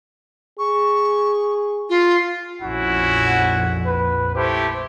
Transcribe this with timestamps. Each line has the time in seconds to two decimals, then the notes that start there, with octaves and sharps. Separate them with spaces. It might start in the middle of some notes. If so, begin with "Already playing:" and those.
0.59 G#4 C#6
1.90 F4
2.61 A#1 F2 C#4 E4 F#4 F#5
3.87 B4
4.35 A3 E4 G4 C5